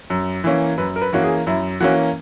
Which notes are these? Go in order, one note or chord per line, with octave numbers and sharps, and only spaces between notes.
F#2
E3 A#3 C#4
F#2 B4
A#4
B4
E3 A#3 C#4 F#4
G#4
F#2 E4
E3 A#3 C#4 F#4